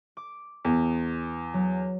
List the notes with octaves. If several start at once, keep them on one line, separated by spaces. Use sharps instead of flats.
D6
E2
F#3